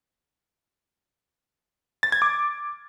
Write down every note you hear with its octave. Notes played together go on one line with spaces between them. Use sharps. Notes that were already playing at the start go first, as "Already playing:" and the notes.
A6
G#6
D6